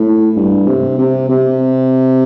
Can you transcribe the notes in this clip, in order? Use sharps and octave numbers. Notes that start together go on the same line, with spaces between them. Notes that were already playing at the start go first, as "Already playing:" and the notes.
Already playing: A2
G2
C3
C3
C3